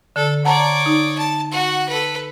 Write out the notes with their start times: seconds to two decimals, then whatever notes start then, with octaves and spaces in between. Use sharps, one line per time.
0.16 D3 A4
0.45 C#5 D5 F#5 A5 A#5
0.86 D#4
1.18 A5
1.51 F#4 F#5
1.88 A4 B4